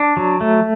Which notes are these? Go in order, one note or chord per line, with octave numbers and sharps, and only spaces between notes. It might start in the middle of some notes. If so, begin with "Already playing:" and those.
Already playing: D4
F#3
A3